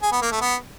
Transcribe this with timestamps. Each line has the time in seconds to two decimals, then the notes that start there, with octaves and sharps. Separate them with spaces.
0.02 G#4
0.12 B3
0.22 A#3
0.32 A3
0.41 B3